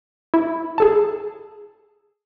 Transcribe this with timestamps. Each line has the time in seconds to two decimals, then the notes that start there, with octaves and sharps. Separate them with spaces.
0.34 E4
0.78 G#4 A4 A5